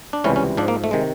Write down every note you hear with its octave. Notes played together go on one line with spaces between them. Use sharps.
D4
C#2 C3 E3 G3 C#4
C#4
G#2 F3 D4
A#3
A3
C3 D#3 G#3